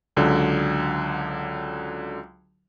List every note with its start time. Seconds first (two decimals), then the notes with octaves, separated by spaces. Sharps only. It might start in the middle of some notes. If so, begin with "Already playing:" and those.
0.17 C#2 D3 F#3